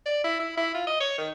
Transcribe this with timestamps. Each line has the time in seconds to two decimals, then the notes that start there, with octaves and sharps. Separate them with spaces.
0.06 D5
0.24 E4
0.40 E4
0.57 E4
0.75 F4
0.87 D#5
1.00 C#5
1.18 D#3